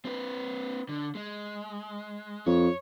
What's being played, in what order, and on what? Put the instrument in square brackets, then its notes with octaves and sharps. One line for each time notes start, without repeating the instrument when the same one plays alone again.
[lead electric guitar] C4 B4
D3
G#3
[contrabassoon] F2 [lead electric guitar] C#5